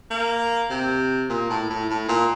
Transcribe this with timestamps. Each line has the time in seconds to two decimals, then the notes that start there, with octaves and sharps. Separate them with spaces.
0.11 A#3
0.70 C3
1.30 A#2
1.50 A2
1.70 A2
1.90 A2
2.09 A#2